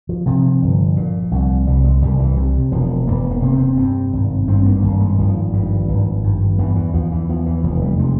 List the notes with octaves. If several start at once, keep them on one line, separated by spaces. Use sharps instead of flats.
F3
C3 F3
G1
A#2
C2
C2 G3
G#3
C2 G3
E3
C3
E1 F3
E1 A#3
A#3
C3
C4
G2 C4
G#1
G2 C4
A#3
G#1 A#3
G#3
G#1 F3
G2
G#1
G2
E2 E3
E3
E2 F3
E3
E2 F3
E3
F1 F3
G3
C3 G#3